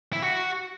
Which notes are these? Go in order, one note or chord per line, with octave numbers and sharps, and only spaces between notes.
E4
F#4